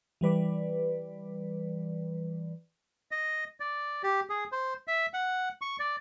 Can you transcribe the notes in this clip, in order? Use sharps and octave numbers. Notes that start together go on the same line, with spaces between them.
E3 G3 B4 D5
D#5
D5
G4
G#4
C5
E5
F#5
C#6
D5